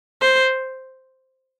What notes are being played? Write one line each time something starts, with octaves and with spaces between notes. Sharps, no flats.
C5